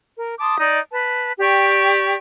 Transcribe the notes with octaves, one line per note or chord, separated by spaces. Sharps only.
A#4
A5 C6 D6 D#6
D#4 D5 D#5
B4 A5
G4 D5 G5 C#6